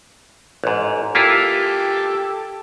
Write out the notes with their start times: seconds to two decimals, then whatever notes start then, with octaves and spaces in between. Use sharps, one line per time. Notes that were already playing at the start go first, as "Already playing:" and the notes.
0.64 A1 G#2
1.15 A#3 E4 F4 G4 A4